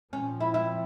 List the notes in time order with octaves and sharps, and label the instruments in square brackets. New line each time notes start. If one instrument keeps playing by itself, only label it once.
[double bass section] A#2 F3 C4 [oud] C#4
[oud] E4
E4